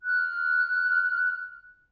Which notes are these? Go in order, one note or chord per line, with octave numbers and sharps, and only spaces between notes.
F6 F#6